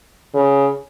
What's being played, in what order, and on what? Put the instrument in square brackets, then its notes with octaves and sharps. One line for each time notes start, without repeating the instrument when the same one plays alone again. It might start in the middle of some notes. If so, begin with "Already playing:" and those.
[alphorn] C#3